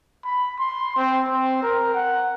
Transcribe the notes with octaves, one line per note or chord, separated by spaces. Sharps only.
B5
C6
C4
C4
A#4
F#5